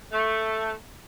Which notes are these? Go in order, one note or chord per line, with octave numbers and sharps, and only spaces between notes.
A3